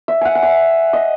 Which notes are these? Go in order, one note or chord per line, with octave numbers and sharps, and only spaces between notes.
E5
F#5 G#5
F#5
E5
D#5